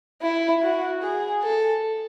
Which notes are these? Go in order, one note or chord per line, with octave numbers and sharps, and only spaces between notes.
E4
F#4
G#4
A4